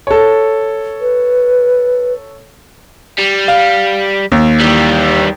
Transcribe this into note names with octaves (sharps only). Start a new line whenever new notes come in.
A4 C#5
B4
G3
F5
D#2
E3 G3